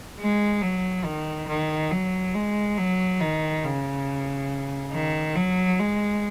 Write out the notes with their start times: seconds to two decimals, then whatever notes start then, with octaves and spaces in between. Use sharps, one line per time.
0.19 G#3
0.62 F#3
1.04 D#3
1.48 D#3
1.91 F#3
2.34 G#3
2.78 F#3
3.21 D#3
3.64 C#3
4.93 D#3
5.35 F#3
5.79 G#3